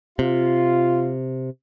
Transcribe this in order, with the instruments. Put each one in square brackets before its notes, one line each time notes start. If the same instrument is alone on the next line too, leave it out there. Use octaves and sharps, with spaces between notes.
[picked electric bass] C3 [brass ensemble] F4